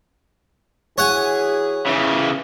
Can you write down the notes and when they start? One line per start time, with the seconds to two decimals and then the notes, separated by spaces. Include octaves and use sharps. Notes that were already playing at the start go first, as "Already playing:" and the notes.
0.98 E3 F#4 G#4 C#5 F#5 G#5
1.87 C#3 E3